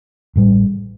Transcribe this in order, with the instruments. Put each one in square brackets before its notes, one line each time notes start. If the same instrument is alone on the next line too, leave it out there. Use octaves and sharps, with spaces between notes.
[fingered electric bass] A1 A2 G3